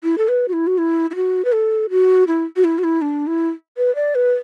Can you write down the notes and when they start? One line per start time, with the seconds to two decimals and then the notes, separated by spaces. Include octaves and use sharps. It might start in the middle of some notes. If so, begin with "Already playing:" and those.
0.04 E4
0.18 A4
0.28 B4
0.48 F#4
0.53 E4
0.67 F#4
0.78 E4
1.11 E4
1.15 F#4
1.45 B4
1.52 A4
1.90 F#4
2.27 E4
2.56 F#4
2.64 E4
2.78 F#4
2.84 E4
3.02 D4
3.27 E4
3.77 B4
3.95 D5
4.15 B4